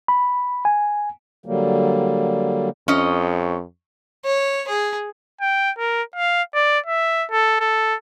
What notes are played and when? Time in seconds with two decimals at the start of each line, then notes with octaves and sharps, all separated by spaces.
0.08 B5
0.65 G#5
1.46 D3 F#3 G3 A#3
2.88 F2 C#4 D#5
4.25 C#5
4.68 G#4
5.41 G5
5.78 A#4
6.16 F5
6.54 D5
6.86 E5
7.31 A4
7.60 A4